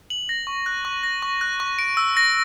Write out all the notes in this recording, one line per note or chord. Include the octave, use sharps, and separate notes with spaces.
F#7
A#6
C#6
F#6
C#6
A#6
C#6
F#6
C#6
D7
E6
A#6